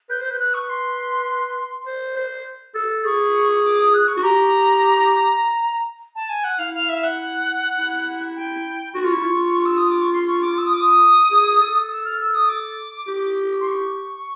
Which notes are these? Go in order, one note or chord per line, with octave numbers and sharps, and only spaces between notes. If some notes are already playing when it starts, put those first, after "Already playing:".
B4 G6
C5 G6
B4 G6
F#6
C#6
C6
C5
C5
A4
G#4 C#6
D6
D#6
F#6
C#6
F#4
G4 A#5
A5
G#5
F#5
E4 F5
F5
E5
F#5
E4
G5
F#4 C#6
F4
E4
F4
E6
D#6
D6
C#6
C6
C#6
D6
E6
D#6
D6
D#6
G#4
A4
E6
F6
E6
D#6
D6
G4
C6
C#6